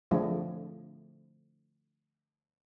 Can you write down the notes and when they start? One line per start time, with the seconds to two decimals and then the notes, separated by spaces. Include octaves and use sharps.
0.11 D3 F3 A3